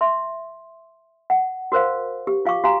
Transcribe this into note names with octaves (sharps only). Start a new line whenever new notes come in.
E5 C6
F#5
F#4 A#4 C5 F5
G4
F4 F5 G5 C#6 D6
F#4 G4 F5 G#5 A#5